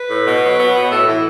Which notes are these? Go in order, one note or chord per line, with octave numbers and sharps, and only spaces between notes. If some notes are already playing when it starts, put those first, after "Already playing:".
Already playing: B4
A2
B2
F#3
B3
B2
A2 A4
E3 E4